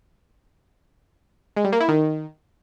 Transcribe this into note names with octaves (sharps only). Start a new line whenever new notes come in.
G#3
G3
A#3
E4
D#3